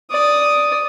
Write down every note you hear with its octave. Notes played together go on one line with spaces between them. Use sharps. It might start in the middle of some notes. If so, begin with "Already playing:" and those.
D5 D#6